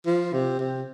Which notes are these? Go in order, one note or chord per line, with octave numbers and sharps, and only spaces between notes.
F3
C3
C3